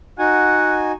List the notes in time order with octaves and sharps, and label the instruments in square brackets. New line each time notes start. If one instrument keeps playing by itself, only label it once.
[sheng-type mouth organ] D#4 F#4 G#5 [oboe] F#5